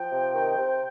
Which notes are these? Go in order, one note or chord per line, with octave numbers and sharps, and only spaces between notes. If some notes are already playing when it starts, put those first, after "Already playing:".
Already playing: F3 G5
C3
D#3
C3